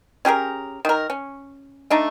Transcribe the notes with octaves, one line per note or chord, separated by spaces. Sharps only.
C#4 G4 G#4 A#4
D#3 A#4
C#4
A3 D4 D#4